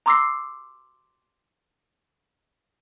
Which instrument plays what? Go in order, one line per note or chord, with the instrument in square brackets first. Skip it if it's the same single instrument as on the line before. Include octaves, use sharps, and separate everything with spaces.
[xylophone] A#5 C6 D6 E6 A#6 C7